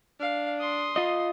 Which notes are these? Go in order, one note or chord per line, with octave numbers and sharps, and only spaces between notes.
D4 F5
C6 D#6
F4 D#5